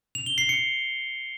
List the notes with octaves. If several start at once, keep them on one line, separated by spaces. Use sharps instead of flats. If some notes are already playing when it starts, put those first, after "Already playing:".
F7
G7
C7
C#7